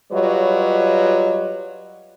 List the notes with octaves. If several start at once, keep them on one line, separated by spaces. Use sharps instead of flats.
F#3 G3 F4 B4 C#5 D#5